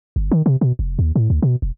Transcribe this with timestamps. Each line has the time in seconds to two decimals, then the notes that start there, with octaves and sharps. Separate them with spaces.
0.16 G1
0.31 D#3
0.46 C3
0.61 B2
0.79 F1
0.99 D#2
1.16 A2
1.30 D2
1.42 B2
1.62 E1